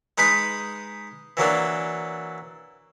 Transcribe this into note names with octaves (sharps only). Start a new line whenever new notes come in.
G#3 D#4 B4 B5 D#6
E3 F#3 A#3 D4